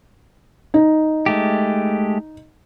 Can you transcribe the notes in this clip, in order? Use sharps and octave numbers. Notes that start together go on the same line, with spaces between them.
D#4
G#3 A3 G4